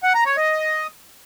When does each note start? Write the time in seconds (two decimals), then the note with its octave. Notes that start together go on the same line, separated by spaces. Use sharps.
0.03 F#5
0.15 A#5
0.26 C#5
0.37 D#5